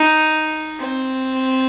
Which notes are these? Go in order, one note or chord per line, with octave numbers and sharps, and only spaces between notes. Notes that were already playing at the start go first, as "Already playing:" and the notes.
Already playing: D#4
C4